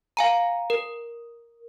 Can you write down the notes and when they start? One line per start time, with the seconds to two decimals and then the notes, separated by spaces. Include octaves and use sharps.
0.17 F5 G#5 A#5
0.70 A#4